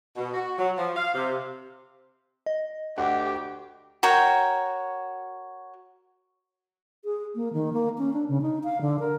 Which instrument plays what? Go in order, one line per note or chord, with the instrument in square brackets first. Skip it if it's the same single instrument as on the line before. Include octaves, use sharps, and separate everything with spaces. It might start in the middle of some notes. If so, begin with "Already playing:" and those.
[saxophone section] B2
F#4
F#3
F3
F5
C3
[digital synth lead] D#5
[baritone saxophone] D2 [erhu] G4 [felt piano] F#5
[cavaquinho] F#4 A#4 C#5 G5
[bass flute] G#4
A#3
D#3
A#3
C#4
D4
C#3
D#4
F5
D3
A#4